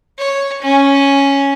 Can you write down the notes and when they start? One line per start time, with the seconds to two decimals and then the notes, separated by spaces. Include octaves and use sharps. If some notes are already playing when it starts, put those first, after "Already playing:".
0.18 C#5
0.62 C#4